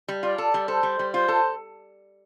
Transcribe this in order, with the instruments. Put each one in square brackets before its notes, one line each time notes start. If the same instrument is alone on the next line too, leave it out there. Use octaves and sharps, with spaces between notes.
[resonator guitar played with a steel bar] G3
[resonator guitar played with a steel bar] F4 [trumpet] D5
[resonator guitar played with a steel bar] A4
G3
[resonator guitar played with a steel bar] A4 [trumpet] C5
[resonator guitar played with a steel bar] G3
G3
[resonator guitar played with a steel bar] F4 [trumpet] C5
[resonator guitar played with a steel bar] A4